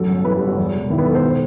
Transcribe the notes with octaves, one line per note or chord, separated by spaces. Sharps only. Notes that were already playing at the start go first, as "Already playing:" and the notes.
Already playing: A1 F#2 A4
G1
E3 B4
G4
G1
F#4
E2
E1
D#3 E4
B3
E1 A4
C5
B2